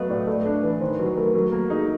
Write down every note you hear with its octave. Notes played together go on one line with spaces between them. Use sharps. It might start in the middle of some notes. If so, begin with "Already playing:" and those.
Already playing: F#3 A3 B3 D#5 F5
A2 D5
A3 A4
D4
E3 B4
D#3 C5
F#3 B4
A3 A#4
F#3 A#4
A#3 A4
D#4 G#4